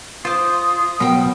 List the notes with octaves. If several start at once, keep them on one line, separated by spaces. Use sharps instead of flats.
F4 C5 D6 D#6
B2 F#3 A#4 G5